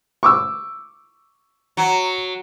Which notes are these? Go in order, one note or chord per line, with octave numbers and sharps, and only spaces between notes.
C#6 D6 E6
F#3